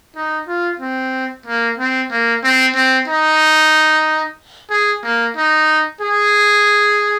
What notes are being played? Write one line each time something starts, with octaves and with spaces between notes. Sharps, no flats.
D#4
F4
C4
A#3
C4
A#3
C4
C4
D#4
G#4
A#3
D#4
G#4